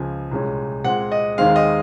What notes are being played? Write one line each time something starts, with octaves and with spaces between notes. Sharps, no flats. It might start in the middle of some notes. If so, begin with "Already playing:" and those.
Already playing: C#2 C#3 F3 G#5
C2 A#2 G#3 C#4
A#2 G#3 C4 F#5
D#5
D#2 D#3 G#3 C4 F5
D#5